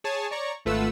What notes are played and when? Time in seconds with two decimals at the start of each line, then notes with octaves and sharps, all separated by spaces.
0.04 G#4 C#5 G#5 A5
0.31 C#5 D5 A#5 C#6
0.65 G#1 A3 F4 B4 F#5 E6